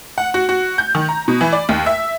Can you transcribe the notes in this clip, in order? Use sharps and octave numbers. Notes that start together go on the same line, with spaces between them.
F#5
F#4
F#4
G6
D#3
A#5
B2
E3
D5
D#2
E5